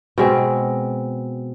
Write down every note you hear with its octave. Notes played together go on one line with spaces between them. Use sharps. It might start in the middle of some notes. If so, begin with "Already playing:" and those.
B2 G#3 C4